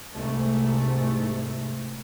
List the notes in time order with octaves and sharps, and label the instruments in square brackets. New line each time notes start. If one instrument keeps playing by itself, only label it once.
[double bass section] C2 G#2 A3